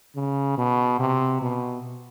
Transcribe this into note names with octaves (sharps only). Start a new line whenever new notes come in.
C#3
B2
C3
B2